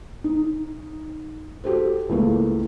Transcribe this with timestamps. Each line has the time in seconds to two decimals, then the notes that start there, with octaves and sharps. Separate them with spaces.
0.24 D#4
1.64 F#4 G4 A4 C5
2.09 C#2 E3 A3 A#3